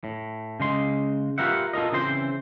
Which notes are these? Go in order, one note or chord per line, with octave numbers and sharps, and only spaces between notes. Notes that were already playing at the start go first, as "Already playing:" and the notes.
A2
C#3 G#3 C6
F4 G4 A#4 B4 E5 F#5
F4 A4 A#4 D#5
C#3 E3 C4 C5 C6